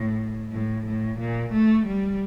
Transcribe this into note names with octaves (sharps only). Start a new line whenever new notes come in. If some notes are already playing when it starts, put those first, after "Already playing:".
Already playing: A2
A2
A2
A#2
A3
G3